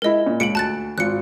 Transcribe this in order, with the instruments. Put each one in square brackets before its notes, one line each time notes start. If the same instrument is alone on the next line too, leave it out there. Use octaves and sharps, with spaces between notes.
[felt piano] G#3 E4 [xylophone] A#4 D#5
[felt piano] A#2
[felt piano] C#2 D7 [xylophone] C#7 F#7
[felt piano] D2 [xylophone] A5 F#6 A6
[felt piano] G#1 F4 [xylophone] F#6 C#7